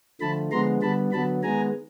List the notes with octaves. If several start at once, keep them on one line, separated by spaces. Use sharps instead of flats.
D3 F3 A3 A5 B5
D3 F3 G#3 B3 A#5 C6
D3 G3 B3 A5 B5
D3 F#3 B3 A5 B5
D#3 G#3 B3 G#5 A#5